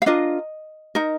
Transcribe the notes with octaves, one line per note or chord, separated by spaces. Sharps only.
F5
D4 F4 A#4 D#5
D#4 A#4